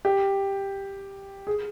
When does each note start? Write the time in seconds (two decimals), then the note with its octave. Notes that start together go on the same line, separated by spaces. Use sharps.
0.05 G4
1.47 G#4